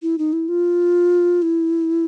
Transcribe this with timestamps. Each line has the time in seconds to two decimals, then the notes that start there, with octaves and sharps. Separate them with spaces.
0.02 E4
0.18 D#4
0.33 E4
0.48 F4
1.42 E4